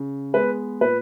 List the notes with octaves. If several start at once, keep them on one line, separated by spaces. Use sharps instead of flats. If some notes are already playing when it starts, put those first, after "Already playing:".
Already playing: C#3
G#3 B3 B4
A#2 B4